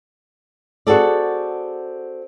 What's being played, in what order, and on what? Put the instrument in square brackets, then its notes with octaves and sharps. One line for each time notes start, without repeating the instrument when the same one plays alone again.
[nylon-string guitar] C4 F#4 G#4 A4 D5